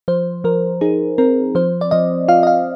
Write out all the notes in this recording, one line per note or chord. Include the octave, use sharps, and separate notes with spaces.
F3 C5
F3 A#4
D#4 G#4
C4 A#4
F3 C5
D5
F3 D#5
F4 F5
D#5
F5